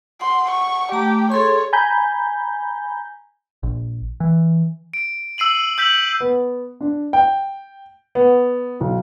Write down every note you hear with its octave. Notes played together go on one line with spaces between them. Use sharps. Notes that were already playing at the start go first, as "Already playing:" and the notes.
F#5 C6
C#6
A3 G4 A#5
G#4 A4 C#5 C6
G#5 A#5 B5 G6
A#1
E3
D7
E6 C7 D#7 F#7
E6 G6 B6 F#7
B3
D4
G5
B3
B1